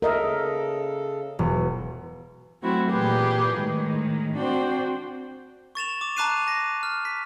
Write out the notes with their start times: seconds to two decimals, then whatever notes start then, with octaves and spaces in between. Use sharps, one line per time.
0.02 C#3 A4 A#4 D#5 E5
1.39 E1
2.61 F#3 A3 C4 E4 F#4
2.90 A#2 E3 G4 G#4 B4
3.56 A2 D#3 G#3
4.36 C4 D4 F#4 C5 G5
5.75 C#6 A6 E7 F7
6.01 D6
6.17 A5 A#5 D6 F#6 C7 D#7
6.48 A#6
6.83 F6
7.05 B6